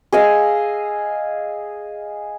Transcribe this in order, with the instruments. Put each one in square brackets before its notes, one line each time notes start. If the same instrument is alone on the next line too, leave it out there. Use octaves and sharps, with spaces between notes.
[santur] G#4 D#5 F5 E6